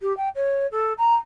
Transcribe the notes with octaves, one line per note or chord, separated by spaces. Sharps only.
G4
G5
C#5
A4
A#5